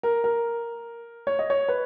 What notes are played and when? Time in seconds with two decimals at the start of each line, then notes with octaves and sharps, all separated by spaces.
0.03 A#4
0.24 A#4
1.27 C#5
1.39 D#5
1.50 C#5
1.69 B4